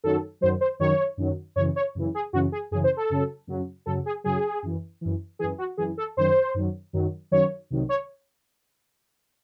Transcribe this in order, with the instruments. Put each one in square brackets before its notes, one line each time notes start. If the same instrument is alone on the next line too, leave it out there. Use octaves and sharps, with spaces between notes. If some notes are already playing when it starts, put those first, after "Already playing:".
[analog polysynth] F#2 D#3 F#3 A4
F#2 D#3 F#3 C5
C5
F#2 D#3 F#3 C#5
F#2 D#3 F#3
F#2 C#3 E3 C#5
C#5
F#2 C#3 E3
G#4
F#2 C#3 E3 F#4
G#4
F#2 C#3 E3 G#4
C5
A4
F#2 C#3 F#3
F#2 C#3 F#3
F#2 C#3 F#3 A4
G#4
F#2 C#3 F#3 G#4
F#2 E3
F#2 E3
F#2 E3 G#4
F#4
F#2 E3 G#4
A4
F#2 D#3 F#3 C5
F#2 D#3 F#3
F#2 D#3 F#3
F#2 D#3 F#3 C#5
C2 C3 D#3 F#3
C#5